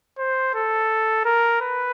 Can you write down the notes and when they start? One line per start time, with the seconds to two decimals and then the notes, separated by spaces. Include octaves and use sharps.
0.18 C5
0.54 A4
1.25 A#4
1.61 B4